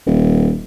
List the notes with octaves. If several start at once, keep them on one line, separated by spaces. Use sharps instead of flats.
D#1